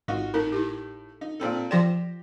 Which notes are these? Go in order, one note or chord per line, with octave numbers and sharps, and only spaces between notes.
G#1 D#4 F4 F#4
A2 D#4 A#4
E4 G4
D#4
A#2 C4 A4
F3 G4 D5 C6 A#6 E7